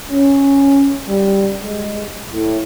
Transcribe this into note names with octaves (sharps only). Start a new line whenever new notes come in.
C#4
G3
G#3
A2